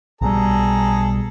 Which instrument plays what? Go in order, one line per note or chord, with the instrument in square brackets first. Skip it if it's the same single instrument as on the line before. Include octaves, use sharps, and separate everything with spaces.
[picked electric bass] B1 B2 G3 [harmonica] G#4 A4 A#5